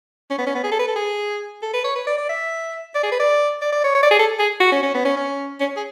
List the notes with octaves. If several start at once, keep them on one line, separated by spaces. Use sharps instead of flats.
C#4
B3
C#4
B3
G#4
A4
B4
A4
G#4
A4
B4
C#5
B4
D5
D5
E5
D5
G#4
B4
D5
D5
D5
C#5
C#5
D5
G#4
A4
G#4
F#4
C#4
C#4
B3
C#4
C#4
C#4
G#4